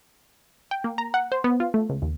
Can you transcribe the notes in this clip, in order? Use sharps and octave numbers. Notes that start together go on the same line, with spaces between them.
G5
A#3
A#5
F#5
C5
B3
F4
A3
C#2
D#2